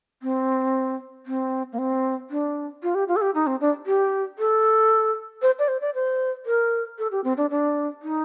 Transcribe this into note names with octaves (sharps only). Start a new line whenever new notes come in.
C4
C4
A#3
C4
D4
F4
G4
F4
A4
G4
D#4
C4
D4
G4
A4
C5
D5
C5
D5
C5
A#4
A4
G4
C4
D4
D4
D#4